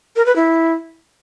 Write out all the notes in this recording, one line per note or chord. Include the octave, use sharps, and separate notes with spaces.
A#4
B4
E4